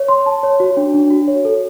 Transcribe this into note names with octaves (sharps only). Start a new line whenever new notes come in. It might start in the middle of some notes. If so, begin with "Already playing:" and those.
Already playing: C#5
C6
A5
C#5
F#4
D4
D4
F#4
C#5
A4